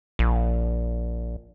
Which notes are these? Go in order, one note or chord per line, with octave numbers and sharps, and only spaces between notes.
A#1